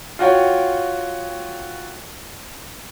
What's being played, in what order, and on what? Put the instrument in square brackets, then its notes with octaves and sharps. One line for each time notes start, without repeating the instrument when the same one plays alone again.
[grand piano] F4 F#4 C#5 G5